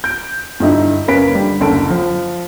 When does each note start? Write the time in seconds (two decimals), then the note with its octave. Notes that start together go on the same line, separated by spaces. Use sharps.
0.04 G6 D7
0.60 G2 D3 D#4 E4
1.08 F#1 A#3 C#4 B4 B6 D7
1.35 D3 G3
1.61 F#1 D2 A4 D7
1.90 F3